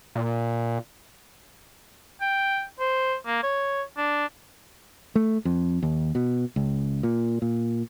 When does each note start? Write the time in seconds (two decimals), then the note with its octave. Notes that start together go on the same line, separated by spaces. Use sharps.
0.15 A#2
2.21 G5
2.79 C5
3.26 A#3
3.43 C#5
3.97 D4
5.15 A3
5.45 F2
5.82 D#2
6.15 B2
6.56 C#2
7.03 A#2
7.42 A#2